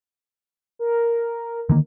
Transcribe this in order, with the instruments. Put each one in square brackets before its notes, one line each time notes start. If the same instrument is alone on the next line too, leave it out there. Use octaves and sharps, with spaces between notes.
[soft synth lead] A#4
[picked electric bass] D3 D#3 A#3